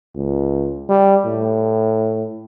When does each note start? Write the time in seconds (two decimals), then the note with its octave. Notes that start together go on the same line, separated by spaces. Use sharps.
0.16 C#2
0.89 G3
1.26 A2